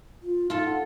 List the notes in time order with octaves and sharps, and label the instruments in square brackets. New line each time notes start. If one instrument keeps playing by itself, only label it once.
[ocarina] F4
[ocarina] D#4 [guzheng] F4 A4
[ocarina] F#5